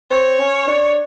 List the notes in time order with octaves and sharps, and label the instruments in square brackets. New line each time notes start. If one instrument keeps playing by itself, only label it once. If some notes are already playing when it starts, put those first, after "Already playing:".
[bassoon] C4 [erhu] C#5
[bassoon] C#4
D4